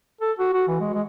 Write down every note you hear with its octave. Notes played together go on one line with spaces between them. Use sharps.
A4
F#4
F#4
E3
G#3
G#3